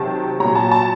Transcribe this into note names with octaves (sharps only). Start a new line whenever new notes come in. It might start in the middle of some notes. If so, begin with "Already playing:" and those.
Already playing: C3 D#3 F#3 A5
A#2 F#3 A#5
A5
A5